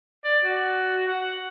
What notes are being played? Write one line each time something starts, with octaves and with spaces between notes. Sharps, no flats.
D5
F#4
F#5